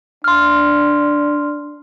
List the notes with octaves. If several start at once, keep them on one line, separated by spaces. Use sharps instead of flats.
D4 C6 F6